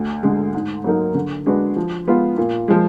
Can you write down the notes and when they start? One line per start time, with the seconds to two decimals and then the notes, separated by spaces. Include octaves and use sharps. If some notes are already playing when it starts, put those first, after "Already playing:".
Already playing: D2
0.23 D3 G#3
0.54 G#2
0.84 F#3 A#3 D#4 A#4
1.15 D3
1.46 G#3 D4 F#4 B4
1.76 F3
2.07 G#3 B3 F4
2.37 A#2
2.68 F3 G#3